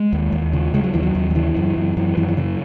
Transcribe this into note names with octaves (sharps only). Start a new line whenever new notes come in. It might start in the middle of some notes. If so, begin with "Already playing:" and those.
Already playing: G#3
D#2
D#2
C#3
C#3 G#3
F#3
D#2 E3
F#3
D#2
F#3
C#3 E3
F#2
F#2
F#2 E3
F#2 E3
E3
C#3 F#3